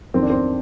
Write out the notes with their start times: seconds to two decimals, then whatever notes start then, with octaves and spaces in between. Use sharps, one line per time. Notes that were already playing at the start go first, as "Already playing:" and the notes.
0.14 F2 D#3 C4
0.22 D4
0.30 C4